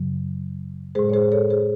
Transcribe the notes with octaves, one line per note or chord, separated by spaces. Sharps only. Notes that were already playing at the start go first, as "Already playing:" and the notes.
Already playing: F#2 C#3 F#3
A2 G#3 G#4 C5
C#5
G#4 C5
A4 C#5
G#4 C5